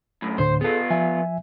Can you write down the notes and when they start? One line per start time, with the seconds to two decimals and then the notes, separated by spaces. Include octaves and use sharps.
0.22 F#2 A2
0.38 D2 A2 D3 C5
0.61 B3 F4 G#4 A4
0.90 F3 E5 G#5